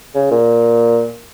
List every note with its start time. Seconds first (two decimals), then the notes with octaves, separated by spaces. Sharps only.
0.15 C#3
0.31 A#2